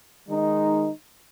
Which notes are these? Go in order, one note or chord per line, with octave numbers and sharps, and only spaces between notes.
D#3 G#3 D#4